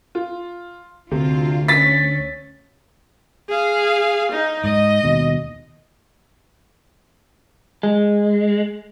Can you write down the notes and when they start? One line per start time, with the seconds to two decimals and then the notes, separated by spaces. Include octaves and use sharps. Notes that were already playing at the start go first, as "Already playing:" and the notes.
0.15 F4
1.12 D2 C3 F4
1.68 C#4 A6 B6
3.49 G#4 F5
4.31 D#4
4.64 G#2 D#5
5.04 D#2 B2
7.83 G#3